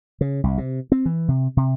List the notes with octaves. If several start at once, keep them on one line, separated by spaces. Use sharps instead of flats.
C#3
C2
C3
C4
E3
C3
C3